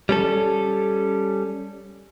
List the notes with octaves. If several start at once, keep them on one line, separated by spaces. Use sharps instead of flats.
G3 C#4 A4